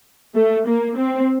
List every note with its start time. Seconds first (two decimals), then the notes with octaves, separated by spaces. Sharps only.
0.35 A3
0.66 A#3
0.97 C4